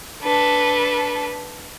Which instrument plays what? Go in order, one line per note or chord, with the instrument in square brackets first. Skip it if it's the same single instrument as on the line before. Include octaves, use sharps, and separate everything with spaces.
[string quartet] D4 A4 B4